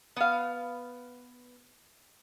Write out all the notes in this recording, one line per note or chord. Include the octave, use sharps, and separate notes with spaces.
B3 F5